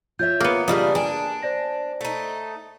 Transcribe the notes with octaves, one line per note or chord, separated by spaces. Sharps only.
F4 C#5 E5 G6
A#3 B3 D#6
C#3 G3 D4 F4 D#5 E5 D#6
D4 G5 G#5
C5 D5 A#6
A3 D#4